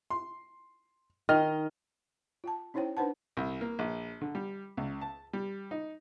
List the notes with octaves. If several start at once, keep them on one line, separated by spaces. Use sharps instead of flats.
C6
D#3 D#5 F6
F4 G5 A5
C#4 D#4 E4 C5 C#5 G5
D4 D#4 B4 C5 F#5 A5
C2
A#3
A#1
D3
G3
C#2
A5
G3
D#4